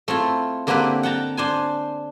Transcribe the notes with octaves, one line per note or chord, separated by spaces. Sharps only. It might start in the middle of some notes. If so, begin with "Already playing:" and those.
A3 C4 E4 F4
D3 A#3 C4 E4 G4 B4
F#5 G5 A5 A#5
D4 C5 G#5